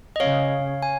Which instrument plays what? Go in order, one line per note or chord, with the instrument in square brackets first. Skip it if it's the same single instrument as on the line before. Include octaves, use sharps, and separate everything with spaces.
[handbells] D#5
[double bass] C#3 [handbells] C#5 F5
[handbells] G#5